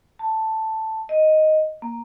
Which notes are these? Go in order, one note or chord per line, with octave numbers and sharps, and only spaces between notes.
A5
D#5
A#3